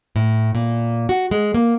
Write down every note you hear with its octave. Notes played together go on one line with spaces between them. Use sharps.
A2
A#2
F#4
G#3
A#3